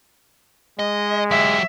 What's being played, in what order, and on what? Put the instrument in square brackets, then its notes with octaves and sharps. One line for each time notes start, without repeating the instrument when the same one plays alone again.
[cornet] G#3 [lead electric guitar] D#5
[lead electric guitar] F#3 G4 [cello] E5